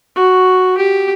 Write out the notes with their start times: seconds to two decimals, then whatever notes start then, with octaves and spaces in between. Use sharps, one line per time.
0.16 F#4
0.77 G4